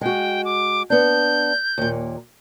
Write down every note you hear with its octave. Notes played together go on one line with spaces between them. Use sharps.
G#3 F#4 G5
D6
B3 D4 G6
D#2 A#2